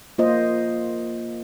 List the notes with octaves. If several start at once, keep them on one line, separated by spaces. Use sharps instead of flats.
A#3 F4 C5 D#5